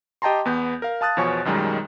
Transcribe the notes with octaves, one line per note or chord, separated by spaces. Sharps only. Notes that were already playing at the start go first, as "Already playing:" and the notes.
G4 D#5 G5 A5 A#5 C6
E2 B3 G6
A#4 F5
F5 A5 D#6 F#6 A6
E2 B2 F3 C#5 G#5 C#6
B1 F#2 D#3 G3 G#3